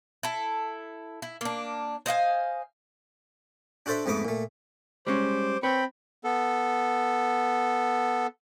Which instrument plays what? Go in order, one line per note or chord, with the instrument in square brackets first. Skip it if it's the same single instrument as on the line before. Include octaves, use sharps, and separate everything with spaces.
[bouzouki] E4 A4
E4
A#3 D4
C5 D#5 F5 G#5
[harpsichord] D4 F#4 A4 C5 D5 E5
F2 G#2 A3 B3 D6 D#6
A#2 A3
[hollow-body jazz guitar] G3 G#3 C#4 [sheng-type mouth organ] C5 D6
[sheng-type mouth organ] C4 G5 B5 [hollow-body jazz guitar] B4 C#5
[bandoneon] B3 A4